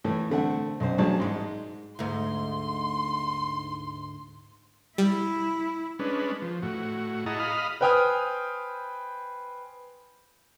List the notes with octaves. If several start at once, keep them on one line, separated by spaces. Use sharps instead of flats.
A2 E3 A3
D3 A3 C4 F#5
B1 F#2 C5
A1 F#3 D4 G#4 A5
G#2 G#3
D2 G#2 C6
G3 E4
G#3 C#4 D4 B4
F3
A2 F#4
E4 G#4 D#5 F#5 A5 A#5
D#5 F5 B5 D#6 F6
B4 C5 G5 G#5 D#6 F6